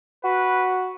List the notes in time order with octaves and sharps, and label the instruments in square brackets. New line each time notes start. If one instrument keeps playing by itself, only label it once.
[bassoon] F#4 [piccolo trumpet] B4